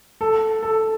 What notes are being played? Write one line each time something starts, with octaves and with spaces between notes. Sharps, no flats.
A4
A4